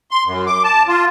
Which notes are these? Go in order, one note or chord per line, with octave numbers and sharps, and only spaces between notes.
C6
F#2
D6
A5
F4